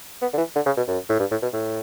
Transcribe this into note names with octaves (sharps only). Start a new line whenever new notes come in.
B3
D3
E3
D3
C#3
B2
F#2
A2
G2
A2
B2
A2